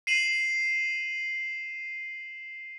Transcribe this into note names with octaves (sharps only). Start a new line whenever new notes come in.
C7 D#7 E7 F#7